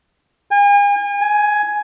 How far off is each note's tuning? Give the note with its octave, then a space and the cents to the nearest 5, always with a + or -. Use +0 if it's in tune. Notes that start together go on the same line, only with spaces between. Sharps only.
G#5 -40
G#5 +10